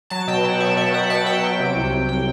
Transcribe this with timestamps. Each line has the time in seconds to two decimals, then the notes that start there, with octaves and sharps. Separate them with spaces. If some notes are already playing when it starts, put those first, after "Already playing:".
0.10 F#3 A5
0.28 B2 G5
0.44 F#3 F#5
0.60 B2 E5
0.77 B2 E5
0.93 B2 F#5
1.10 B2 A5
1.26 B2 G5
1.43 F#3
1.60 C3
1.76 C2
1.92 C2
2.09 G5